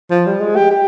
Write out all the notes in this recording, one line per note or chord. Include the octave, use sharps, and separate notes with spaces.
F3
G3
G#3
G4
G4